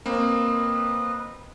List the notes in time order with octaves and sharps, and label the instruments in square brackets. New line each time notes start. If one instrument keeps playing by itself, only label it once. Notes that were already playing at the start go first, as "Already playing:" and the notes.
[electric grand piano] A#3 C4 [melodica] B4 D#5